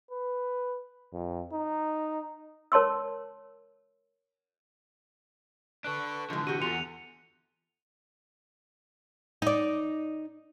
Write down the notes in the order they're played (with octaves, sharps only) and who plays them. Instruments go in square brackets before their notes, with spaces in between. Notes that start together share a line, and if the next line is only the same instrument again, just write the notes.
[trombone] B4
F2
D#4
[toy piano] A#4 C#5 A5 C6 E6
[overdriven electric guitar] D4 A4 [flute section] B4 C#6 [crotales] F#6
[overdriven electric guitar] D3 E3 [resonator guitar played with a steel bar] F3 G#3
[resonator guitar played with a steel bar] F#4 G4 [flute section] F#5 [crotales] D#7
[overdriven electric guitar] E2 [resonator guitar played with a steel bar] F4 A4 [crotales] C#7 F7
[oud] D#4 D5